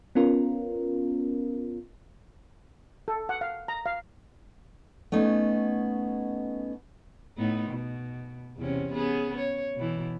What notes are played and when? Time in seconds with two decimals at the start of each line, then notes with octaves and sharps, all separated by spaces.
0.15 B3 C#4 F4 A#4
3.08 A4
3.29 F#5
3.41 F5
3.68 A#5
3.86 F5
5.12 A3 B3 C#4 D#4
7.37 A2 B3 D#4
7.69 B2
8.57 E2 C3 C#4
8.94 B3 C#4 G#4
9.37 C#5
9.76 B2 E3